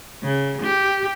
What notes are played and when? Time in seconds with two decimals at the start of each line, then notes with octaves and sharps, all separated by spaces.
0.23 C#3
0.62 G4